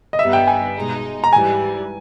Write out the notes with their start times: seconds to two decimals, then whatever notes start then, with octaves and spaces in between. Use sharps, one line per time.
0.13 D#5
0.19 G1 G2 G3 B3 D#4 E5
0.33 G5
0.47 G#5
0.75 B2 G#3 D#4
1.24 A#5
1.33 G#2 E3 G3 G#5